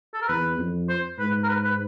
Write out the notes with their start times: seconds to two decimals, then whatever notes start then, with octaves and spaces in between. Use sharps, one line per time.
0.14 A4
0.22 A#4
0.28 E2 B4
0.59 F2
0.89 C5
1.19 G#2 B4
1.44 A#4
1.49 B4
1.65 B4